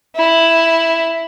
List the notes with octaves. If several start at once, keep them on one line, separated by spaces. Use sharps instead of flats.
E4